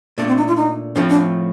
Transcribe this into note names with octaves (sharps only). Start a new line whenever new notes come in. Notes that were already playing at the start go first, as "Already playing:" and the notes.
A#2 A3 A#3 D4
C4
D#4
F4
D#4
A2 F3 A3 C4 D4
D4